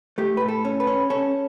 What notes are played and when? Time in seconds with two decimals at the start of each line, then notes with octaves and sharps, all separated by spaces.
0.18 A3 G4
0.37 A2 B4
0.48 A4
0.65 C#4
0.80 B4
0.87 C#4
1.10 C#4 A4